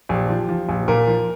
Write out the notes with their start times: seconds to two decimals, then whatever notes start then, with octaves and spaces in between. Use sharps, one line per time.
0.09 A#1 G4
0.29 F3
0.49 F3
0.69 A#1
0.88 A#2 A#4
1.08 F3